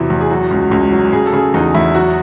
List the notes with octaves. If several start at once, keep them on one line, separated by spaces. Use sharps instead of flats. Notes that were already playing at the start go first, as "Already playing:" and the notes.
Already playing: E2 C3 E3 F#3 E4
E2
G#4
F#3 F#4
C#2
C#2
F#3
C#3 G#4
A4
C#3 G#4
E2 D#4
E2 E4
F#3 F#4